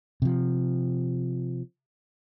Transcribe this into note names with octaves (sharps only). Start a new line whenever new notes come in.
C3 F3